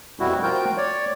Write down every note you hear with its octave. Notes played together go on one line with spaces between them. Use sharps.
F2 B2 G3 E4 F#4
F3 F4 F#4 A#4 G5 G6
C#5 D5